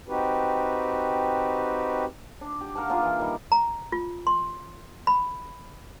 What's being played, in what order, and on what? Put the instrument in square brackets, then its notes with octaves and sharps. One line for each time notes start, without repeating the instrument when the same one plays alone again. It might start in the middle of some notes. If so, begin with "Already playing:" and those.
[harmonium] C4 D#4 F#4 G4 B4
[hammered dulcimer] D4
G4
A#4 F5 F#5 A5
A#3 D4 F4 G#4
E3
D#3 G3
[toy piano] A#5
F4
C6
B5